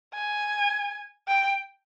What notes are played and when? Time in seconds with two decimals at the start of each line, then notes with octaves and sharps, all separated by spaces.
0.14 G#5
1.28 G5